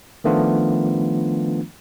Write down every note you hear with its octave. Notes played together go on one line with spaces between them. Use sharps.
D#3 F3 A3 B3 D4 F4